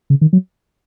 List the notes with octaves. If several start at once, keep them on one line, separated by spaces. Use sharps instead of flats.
C#3
D#3
F#3